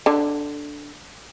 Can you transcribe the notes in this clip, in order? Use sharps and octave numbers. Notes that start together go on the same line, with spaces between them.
D3